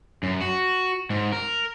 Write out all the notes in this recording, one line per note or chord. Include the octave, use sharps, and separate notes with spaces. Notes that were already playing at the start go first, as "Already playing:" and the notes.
F#2
F#4
G#2
A#4